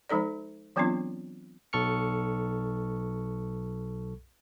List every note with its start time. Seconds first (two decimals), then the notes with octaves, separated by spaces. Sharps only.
0.09 F3 G#3 D#4 A4 D5
0.76 E3 F#3 B3 C4 D4 F4
1.73 B1 A4 C#6 F6 C#7